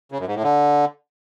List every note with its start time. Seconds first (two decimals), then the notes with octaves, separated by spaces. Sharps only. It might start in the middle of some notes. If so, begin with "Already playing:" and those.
0.12 C#3
0.20 F#2
0.28 G#2
0.35 A2
0.43 D3